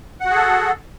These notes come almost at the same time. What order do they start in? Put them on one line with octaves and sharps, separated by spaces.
F#5 F#4 G#4 A4